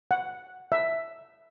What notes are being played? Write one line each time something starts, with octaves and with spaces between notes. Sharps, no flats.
F#5
E5